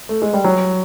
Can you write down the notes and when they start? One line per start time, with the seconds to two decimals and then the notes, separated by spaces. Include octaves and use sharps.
0.09 A3
0.22 G#3
0.34 G3
0.44 F#3